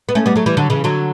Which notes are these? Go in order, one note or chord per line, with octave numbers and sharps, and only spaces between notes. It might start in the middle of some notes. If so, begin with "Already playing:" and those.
B3
A3 C#4
G3 B3
F#3 A3
E3 G3
D3 F#3
C#3 E3
D3 F#3